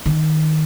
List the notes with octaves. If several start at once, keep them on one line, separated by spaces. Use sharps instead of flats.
D#3